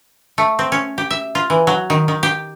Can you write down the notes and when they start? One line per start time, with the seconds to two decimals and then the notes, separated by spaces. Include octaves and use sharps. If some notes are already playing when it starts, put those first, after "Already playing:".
0.38 A3
0.59 C4
0.72 C#4
0.98 G4
1.10 E5
1.35 F4
1.50 E3
1.67 F#3
1.90 D#3
2.08 D#3
2.23 G4